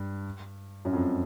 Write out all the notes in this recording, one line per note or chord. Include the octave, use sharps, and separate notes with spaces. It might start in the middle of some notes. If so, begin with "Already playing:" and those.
Already playing: G2
F#2
F2